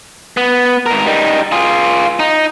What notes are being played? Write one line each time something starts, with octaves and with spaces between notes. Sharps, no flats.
B3
G#2 A#4
G3 D#4
F4 G#4
D#4